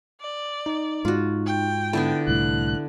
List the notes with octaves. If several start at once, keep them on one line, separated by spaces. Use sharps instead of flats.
D5
D#4
G#2 F4 F#4
G5
D3 B3 D4 E4
C2 A2 F#6